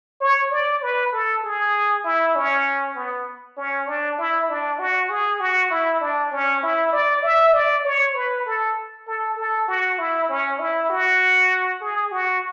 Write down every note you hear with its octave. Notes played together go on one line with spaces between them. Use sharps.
C#5
D5
B4
A4
G#4
E4
C#4
B3
C#4
D4
E4
D4
F#4
G#4
F#4
E4
D4
C#4
E4
D5
E5
D5
C#5
B4
A4
A4
A4
F#4
E4
C#4
E4
F#4
G#4
F#4